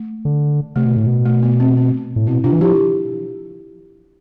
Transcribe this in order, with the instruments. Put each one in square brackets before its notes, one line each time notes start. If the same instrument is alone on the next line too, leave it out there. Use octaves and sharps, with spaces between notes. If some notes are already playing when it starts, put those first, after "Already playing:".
Already playing: [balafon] A3
[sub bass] D3
[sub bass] C3 [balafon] A3
[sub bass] B2
A2
B2
[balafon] A3
B3
C4
C4
[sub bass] A2
[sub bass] B2 [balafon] C4 E4
[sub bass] C3 [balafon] D4 F4
[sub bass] E3
[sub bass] F3 [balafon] E4 G4